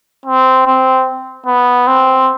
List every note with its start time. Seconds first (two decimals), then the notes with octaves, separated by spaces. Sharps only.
0.26 C4
0.67 C4
1.46 B3
1.87 C4